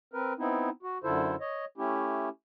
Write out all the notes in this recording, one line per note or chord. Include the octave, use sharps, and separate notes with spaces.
C4 A#4 B4
B3 C4 D#4 E4
F#4
F#2 D3 E4 F4 A4 C5
C#5 D#5
A3 C#4 E4 G4